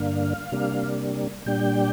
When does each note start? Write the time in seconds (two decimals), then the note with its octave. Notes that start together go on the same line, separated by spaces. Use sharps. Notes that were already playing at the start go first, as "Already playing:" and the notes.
Already playing: G2 D3 A#3 D4 F5
0.52 C3 G3 A#3 D4
1.46 A#2 G3 D4 G5